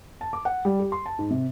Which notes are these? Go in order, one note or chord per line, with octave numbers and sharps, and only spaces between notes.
A5
D6
F#5
G3
G4
C6
A5
G#2
C3